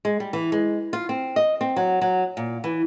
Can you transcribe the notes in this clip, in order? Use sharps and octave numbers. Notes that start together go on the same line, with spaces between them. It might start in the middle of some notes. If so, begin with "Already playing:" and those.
G#3
G3
E3
G#3
F4
C4
D#5
C4
F#3
F#3
A#2
E3